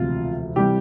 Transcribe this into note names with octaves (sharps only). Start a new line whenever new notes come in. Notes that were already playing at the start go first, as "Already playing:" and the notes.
Already playing: E1 D2 C3 F3 F4
C3 E3 G3 G4